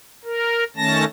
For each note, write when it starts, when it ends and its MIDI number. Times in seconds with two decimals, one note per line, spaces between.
0.25 0.64 70
0.76 1.05 51
0.76 1.05 57
0.76 1.05 61
0.76 1.05 81
0.76 1.05 94